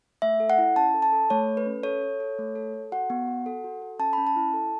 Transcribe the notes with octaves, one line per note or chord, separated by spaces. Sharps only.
A3 E5
A4
F#5
E4
C#4 A5
A4
A5
A4
A3 C#5
A4
B4
C#4
A4 C#5
A4
A4
A3
A4
A4
F#4 F#5
B3
F#4
A4
F#4
A4
C#4 A5
C#4 B5
A5
E4
A4